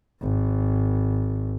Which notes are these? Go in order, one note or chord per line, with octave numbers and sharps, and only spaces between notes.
G#1